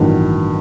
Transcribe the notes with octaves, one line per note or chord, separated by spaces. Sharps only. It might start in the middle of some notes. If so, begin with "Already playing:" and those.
Already playing: A1 G2 D#3 F#3